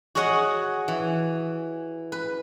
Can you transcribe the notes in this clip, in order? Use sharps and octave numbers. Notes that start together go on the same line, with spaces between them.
F#4 G#4 C#5 D#5 F#5
E3
B4